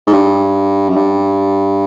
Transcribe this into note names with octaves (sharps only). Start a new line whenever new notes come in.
G#2
G2
F#2
G2